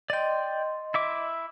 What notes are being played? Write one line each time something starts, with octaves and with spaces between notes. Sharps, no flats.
D5 D#5 G5 C6
E4 E5 D6